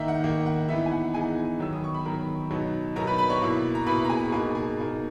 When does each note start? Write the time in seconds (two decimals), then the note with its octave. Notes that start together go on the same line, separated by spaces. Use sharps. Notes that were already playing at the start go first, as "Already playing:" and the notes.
Already playing: D#3 A#3 D#4 E5
0.08 F#5
0.24 D#3 A#3 D#4
0.46 F#5
0.69 E3 B3 D#4 E5
0.86 G#5
0.91 F#5
1.14 E3 B3 D#4 G#4 G#5
1.59 D#3 F#3 B3 E6
1.73 D#6
1.84 C#6
1.94 B5
2.05 D#3 F#3 B3 A#4 A#5
2.51 B2 F#3 B3 D#4
2.96 B2 F#3 B3 D#4 A#4 A#5
3.07 B4 B5
3.18 B4 B5
3.29 C#5 C#6
3.42 B2 A#3 E4
3.75 A#5
3.87 B2 A#3 E4 B4 B5
4.05 A#5
4.10 G#4 G#5
4.32 B2 A#3 D#4 G#4 G#5
4.55 G#4 G#5
4.77 B2 A#3 D#4